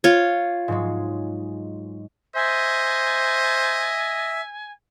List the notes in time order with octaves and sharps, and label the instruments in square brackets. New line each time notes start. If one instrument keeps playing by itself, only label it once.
[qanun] F4 C#5
[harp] G#2 F#3 G#3
[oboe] C5 [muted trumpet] D#5 [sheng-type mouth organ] E5 [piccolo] G#5